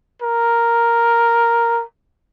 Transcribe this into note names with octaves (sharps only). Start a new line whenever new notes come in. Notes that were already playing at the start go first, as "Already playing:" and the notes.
A#4